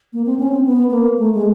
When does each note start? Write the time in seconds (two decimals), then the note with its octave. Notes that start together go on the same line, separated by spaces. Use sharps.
0.13 A#3
0.26 C4
0.39 C#4
0.52 C4
0.66 B3
0.91 A#3
1.18 A3
1.34 G#3